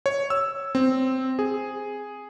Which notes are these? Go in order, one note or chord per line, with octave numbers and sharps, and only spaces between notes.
C#5
E6
C4
G#4